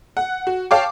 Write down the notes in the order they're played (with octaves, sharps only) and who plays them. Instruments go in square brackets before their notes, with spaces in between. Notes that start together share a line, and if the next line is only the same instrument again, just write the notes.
[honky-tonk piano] F#5
F#4
C#5 F5 G5 A5 D6